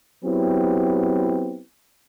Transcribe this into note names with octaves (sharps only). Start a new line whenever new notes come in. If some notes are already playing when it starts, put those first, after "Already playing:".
F#3 B3 C4 E4 G4